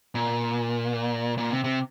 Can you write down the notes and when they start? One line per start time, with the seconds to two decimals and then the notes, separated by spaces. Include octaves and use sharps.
0.15 A#2
1.38 A#2
1.51 C3
1.64 C3